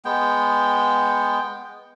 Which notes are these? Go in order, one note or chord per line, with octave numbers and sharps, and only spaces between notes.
G#3 B3 G5